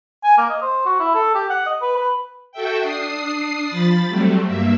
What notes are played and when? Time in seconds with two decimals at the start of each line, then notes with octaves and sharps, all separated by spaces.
0.24 G#5
0.38 A#3
0.50 D#5
0.62 C5
0.86 F#4
1.00 E4
1.15 A4
1.35 G4
1.50 F#5
1.66 D#5
1.82 B4
1.97 B4
2.52 F#4 A4 E5 G5
2.82 D4 D#6 C7
3.67 F3 B5 A6
4.07 F#3 G3 A3 C4
4.45 G2 A#3 E5